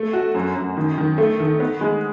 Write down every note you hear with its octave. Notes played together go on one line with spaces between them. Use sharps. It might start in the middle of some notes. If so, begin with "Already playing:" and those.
Already playing: A3
F#4
F#2
F#2
D#3
D#3
A3
D#3
B3
G#3